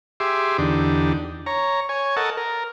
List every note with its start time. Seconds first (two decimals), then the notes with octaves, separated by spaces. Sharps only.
0.20 G4 G#4 E5 C6 D6
0.58 E2 D3 D4 D#4 G4
1.46 C#5 A#5
1.89 C#5 G#5
2.16 A4 A#4 D#5 F#5 A5
2.37 A#4